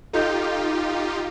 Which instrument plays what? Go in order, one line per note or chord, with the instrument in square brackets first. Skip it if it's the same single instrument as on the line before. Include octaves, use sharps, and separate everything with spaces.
[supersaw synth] D#4 F4 G4 [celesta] A4 D#5 G6